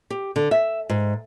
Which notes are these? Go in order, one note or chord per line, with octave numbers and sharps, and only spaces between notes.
G4
D3
E5
G#2